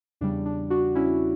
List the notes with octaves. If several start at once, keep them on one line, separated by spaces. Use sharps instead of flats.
E2 C#3 G3 D4
D4
D4 F#4
C#4 E4